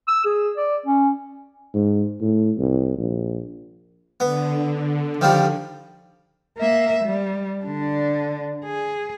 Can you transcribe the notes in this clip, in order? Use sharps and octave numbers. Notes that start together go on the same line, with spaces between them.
E6
G#4
D5
C#4
G#2
A2
C2
A#1
D3 B3
D#3 F3 G3
A#3 E5
G3
D3 D4
G#4